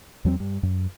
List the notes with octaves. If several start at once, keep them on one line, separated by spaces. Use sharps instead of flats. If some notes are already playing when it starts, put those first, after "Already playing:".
E2 F#3 A3 C4
G2
F#2